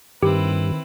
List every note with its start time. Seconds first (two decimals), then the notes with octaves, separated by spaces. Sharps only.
0.23 G2 D#3 C4 E4 G4 B4